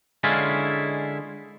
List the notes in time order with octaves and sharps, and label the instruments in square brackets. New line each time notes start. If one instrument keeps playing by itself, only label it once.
[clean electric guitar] D3 G#3 C#4 E4 F4 G#4